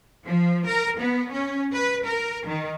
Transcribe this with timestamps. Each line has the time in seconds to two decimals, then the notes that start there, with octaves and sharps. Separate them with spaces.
0.25 F3
0.66 A#4
0.99 B3
1.30 C#4
1.74 B4
2.06 A#4
2.47 D#3